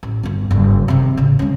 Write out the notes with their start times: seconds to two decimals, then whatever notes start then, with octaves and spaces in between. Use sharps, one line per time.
0.03 A1
0.23 G1 D4
0.51 F#1 G2
0.88 C3 D#3
1.17 A1 C#3
1.39 G#3 C#4